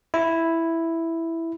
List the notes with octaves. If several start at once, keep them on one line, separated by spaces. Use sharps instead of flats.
E4